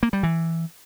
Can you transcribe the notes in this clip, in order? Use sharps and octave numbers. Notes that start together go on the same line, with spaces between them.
A#3
G3
E3